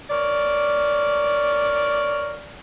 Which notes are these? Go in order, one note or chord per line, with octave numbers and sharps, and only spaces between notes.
A#4 C#5 D5